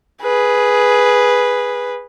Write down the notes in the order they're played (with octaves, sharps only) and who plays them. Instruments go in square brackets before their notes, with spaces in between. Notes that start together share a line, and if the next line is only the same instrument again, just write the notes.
[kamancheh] G#4 B4